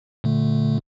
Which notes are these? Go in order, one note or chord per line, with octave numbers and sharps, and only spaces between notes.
A#2 D3 A3